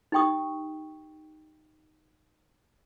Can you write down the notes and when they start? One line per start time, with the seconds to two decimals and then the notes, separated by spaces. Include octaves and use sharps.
0.12 D#4 G4 G5 C#6 D#6